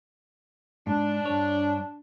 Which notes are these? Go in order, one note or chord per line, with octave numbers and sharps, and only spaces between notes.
G#2 D4
G2 C#5